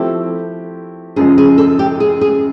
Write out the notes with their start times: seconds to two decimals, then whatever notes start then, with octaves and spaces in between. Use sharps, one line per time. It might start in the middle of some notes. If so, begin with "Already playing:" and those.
Already playing: F3 A3 C4 E4 G4 A4
1.16 F#2 C#3 F3 G#3 G#4
1.38 G#4
1.58 A4
1.79 G4
2.00 G#4
2.21 G#4